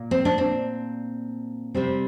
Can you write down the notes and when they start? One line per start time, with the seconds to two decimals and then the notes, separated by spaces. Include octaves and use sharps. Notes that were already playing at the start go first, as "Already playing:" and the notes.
Already playing: A#2
0.11 C4
0.25 D4
0.38 C4
1.74 C3 G3 C4